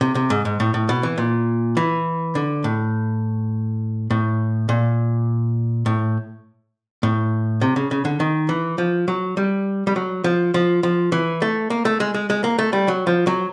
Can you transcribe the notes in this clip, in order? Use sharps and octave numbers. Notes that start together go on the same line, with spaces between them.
C3
C3
G#2
G#2
A2
A2
B2
E3
A#2
E3
D3
A2
A2
A#2
A2
A2
C3
C#3
C#3
D3
D#3
E3
F3
F#3
G3
G3
F#3
F3
F3
F3
E3
A3
A#3
A3
G#3
G#3
G#3
A#3
A3
G3
F#3
F3
F#3